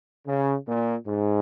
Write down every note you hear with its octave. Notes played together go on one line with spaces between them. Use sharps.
C#3
A#2
G#2